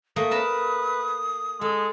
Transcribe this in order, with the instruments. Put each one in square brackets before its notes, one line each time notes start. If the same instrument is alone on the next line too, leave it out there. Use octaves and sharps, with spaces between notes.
[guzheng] A3 A#3 [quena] D#6
[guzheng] A#4 A5 B5 [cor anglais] B4
[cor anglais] G#3 [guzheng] A4